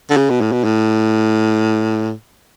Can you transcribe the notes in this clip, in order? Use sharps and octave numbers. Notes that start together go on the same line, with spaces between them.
D3
C#3
B2
A2
B2
A2